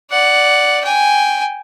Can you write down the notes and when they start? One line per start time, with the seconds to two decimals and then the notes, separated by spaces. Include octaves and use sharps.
0.11 D5 F#5
0.84 G5 G#5